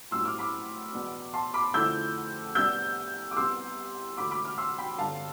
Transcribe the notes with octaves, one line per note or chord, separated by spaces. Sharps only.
B1 A2 G3 C4 E4 C6 E6
D6 F6
B5 D6
E2 B2 B3 D4
A5 C6
B5 D6
F2 D3 F3 A3 E4 E6 G6
C2 C3 G3 B3 D4 E6 G6
D6
C2 C3 G3 B3 C6 E6
E1 D2 D3 B5 D6
B5 D6
D6 F6
C6 E6
G5 B5
G1 G2 D3 F5 A5